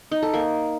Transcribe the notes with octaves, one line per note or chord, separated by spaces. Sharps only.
D#4
A4
A#3